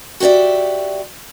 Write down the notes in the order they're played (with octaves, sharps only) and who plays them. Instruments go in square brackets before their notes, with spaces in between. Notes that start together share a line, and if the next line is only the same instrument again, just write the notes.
[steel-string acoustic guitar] F#4 G4 C#5 D5 E5